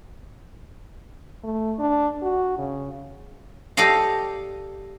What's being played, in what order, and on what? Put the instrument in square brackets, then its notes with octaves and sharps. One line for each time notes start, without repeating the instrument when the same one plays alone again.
[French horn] A3
D4
F#4
C#3
[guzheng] G4 A4 D5 D#5 F5